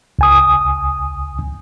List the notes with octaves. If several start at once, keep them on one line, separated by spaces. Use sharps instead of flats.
C#2 G#5 D#6